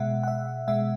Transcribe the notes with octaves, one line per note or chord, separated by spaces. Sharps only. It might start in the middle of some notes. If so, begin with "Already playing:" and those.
Already playing: B2 G#3 E5 F#5
F#5
E5
B2 G#3 E5